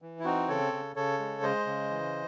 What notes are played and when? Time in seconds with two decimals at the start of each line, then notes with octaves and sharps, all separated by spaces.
0.02 E3
0.19 E4
0.25 C4 D#4 F#4
0.48 C#3 A4 C#5
0.73 C#3
0.96 C#3 A4 C#5
1.19 G#3
1.42 G#3 C5 D#5
1.66 C#3
1.90 E3